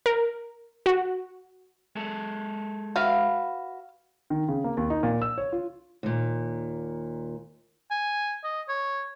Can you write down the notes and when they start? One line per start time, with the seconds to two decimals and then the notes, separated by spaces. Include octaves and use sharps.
0.06 A#4
0.86 F#4
1.96 G#3 A4
2.96 F#4 B4 E5 F5
4.30 D#3
4.48 C#3
4.64 A#3
4.77 D#2
4.90 D#4
5.03 A#2
5.22 E6
5.38 C#5
5.52 F4
6.03 D#2 A#2
7.91 G#5
8.44 D#5
8.69 C#5